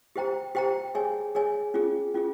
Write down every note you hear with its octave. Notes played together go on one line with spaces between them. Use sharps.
G4 C5 G5 A#5
G4 C5 G5 A#5
G#4 C#5 G#5
G#4 C#5 G#5
C#4 F4 G#4
C#4 F4 G#4